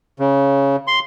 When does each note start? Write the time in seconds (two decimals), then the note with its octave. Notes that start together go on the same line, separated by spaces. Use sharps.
0.19 C#3
0.87 C6